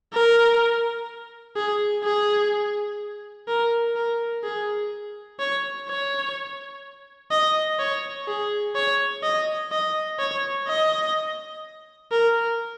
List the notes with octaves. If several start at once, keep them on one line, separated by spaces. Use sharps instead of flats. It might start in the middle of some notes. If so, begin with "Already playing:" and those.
A#4
G#4
G#4
A#4
A#4
G#4
C#5
C#5
D#5
C#5
G#4
C#5
D#5
D#5
C#5
D#5
A#4